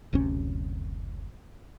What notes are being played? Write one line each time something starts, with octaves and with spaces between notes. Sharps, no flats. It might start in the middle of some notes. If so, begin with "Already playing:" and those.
F#1 D2 C3 C#4